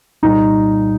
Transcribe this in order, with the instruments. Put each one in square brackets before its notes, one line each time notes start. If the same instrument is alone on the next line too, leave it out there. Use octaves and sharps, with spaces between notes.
[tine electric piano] C2 A#2 G3 [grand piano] D#4